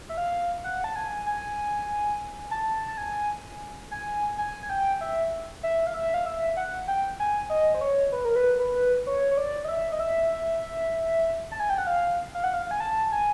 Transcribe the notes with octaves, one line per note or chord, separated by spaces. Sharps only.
E5
F5
F#5
A5
G#5
G#5
A5
A5
G#5
G#5
G#5
G#5
G5
E5
E5
F5
E5
F5
E5
F#5
G5
G#5
D#5
C5
C#5
B4
A#4
B4
B4
C#5
C#5
D5
D#5
E5
D#5
E5
A5
G#5
G5
F#5
F5
F5
F#5
F5
G#5
A5
G#5